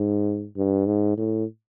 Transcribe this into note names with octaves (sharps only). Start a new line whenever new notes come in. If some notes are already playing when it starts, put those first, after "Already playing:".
Already playing: G#2
G2
G#2
A2